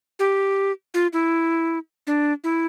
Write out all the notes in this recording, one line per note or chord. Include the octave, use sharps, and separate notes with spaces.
G4
F4
E4
D4
E4